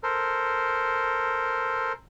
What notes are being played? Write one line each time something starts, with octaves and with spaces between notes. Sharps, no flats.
A4 A#4 C5